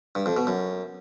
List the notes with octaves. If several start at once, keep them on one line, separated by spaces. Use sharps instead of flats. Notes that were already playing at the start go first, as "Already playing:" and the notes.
G2
F2
B2
F#2